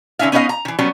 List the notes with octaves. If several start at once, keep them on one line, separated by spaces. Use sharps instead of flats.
D3 C#4 D#4 E5 F5
B3 C#4 D#4 B4 D#5 F5
A#5
D#3 E3
F#3 G3 B3 C#4